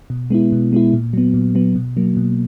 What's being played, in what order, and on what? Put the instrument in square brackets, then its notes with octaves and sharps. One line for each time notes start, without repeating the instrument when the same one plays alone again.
[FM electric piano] B2
G#3 B3 E4
B2
G#3 B3 E4
A#2
F#3 B3
A#2
F#3 B3
B2
F#3 A#3
B2